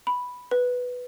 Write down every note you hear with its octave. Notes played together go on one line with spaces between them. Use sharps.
B5
B4